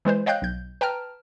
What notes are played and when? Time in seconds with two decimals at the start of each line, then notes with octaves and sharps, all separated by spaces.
0.05 E3 G#3 B4 C5
0.26 C#5 D#5 F5 G5 F#6 G6
0.42 B1 G6
0.81 B4 G5 A5 A#5 F6